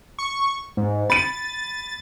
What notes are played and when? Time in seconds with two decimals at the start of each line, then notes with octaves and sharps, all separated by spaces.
0.19 C#6
0.77 G#2
1.10 B5 A6 D#7